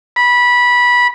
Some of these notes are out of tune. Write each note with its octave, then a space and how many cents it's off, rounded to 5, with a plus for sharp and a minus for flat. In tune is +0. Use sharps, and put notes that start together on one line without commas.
B5 -15